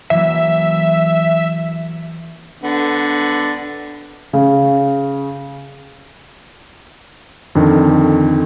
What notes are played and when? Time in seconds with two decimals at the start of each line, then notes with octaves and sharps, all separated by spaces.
0.10 E3 F#3 A#3 E5
2.63 D3 B3
4.33 C#3
7.55 F2 D3 D#3